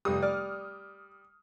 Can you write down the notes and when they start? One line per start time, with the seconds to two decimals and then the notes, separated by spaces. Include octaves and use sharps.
0.05 F1 G3 D#6
0.22 D5 F6